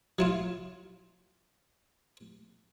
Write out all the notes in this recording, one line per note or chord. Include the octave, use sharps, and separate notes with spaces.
F#3 E4 F4